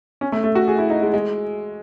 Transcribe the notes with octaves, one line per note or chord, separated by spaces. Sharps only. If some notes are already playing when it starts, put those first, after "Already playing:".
C#4
A3
A3
F#4
G#4
E4
D#4
G#3
G#3